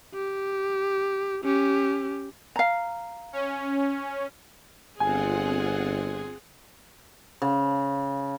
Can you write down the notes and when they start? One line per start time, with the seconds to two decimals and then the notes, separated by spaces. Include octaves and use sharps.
0.14 G4
1.44 C#4 G4
2.56 F5 A#5
3.33 C#4
5.00 G1 C4 F4 G#4 F#5 G#5
7.42 C#3